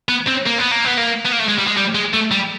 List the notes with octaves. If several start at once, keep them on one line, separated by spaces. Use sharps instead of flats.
B3
C4
A#3
B3
A#3
B3
A#3
B3
A#3
A3
G#3
G3
G#3
G3
G#3
A3
G3